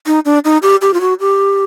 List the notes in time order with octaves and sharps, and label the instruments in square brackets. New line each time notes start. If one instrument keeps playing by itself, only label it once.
[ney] D#4
D4
D#4
G4
G4
F4
F#4
G4